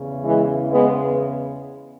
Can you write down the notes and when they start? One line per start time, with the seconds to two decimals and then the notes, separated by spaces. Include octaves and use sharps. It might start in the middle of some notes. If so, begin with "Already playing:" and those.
Already playing: E2 C#3
0.24 E3 G#3
0.70 G#3 B3